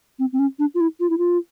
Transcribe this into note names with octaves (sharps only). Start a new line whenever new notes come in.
C4
C4
C#4
D4
F4
E4
F4
E4
F4